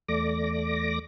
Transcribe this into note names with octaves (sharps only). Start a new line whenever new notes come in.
E2 A3 D5 D6 A#6